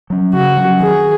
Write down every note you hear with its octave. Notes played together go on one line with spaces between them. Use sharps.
F#3 C#4
C#3 F#4
F#3 C#4
D#3 G#4